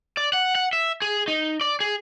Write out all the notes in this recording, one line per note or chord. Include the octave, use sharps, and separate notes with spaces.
D5
F#5
F#5
E5
G#4
D#4
D5
G#4